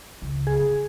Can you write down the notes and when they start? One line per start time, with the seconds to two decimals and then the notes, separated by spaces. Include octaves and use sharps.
0.22 C#2
0.47 G#4
0.60 D3